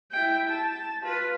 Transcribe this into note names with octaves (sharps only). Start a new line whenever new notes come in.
E4 G5
A5
F4 B4